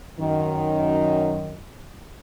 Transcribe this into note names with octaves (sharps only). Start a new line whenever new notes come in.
F#2 D#3